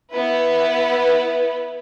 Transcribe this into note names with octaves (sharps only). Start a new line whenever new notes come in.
B3 E4 B4